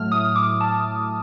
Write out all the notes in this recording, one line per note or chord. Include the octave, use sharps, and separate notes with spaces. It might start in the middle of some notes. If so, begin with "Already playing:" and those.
Already playing: A2 F#3 A3 F6
D#6
D6
A5